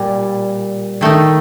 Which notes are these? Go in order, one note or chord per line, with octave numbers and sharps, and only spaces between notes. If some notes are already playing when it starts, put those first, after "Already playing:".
Already playing: A#2 G3
D#3 A3 D#4